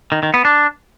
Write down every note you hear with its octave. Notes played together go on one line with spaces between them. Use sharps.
D#3
D#3
B3
D4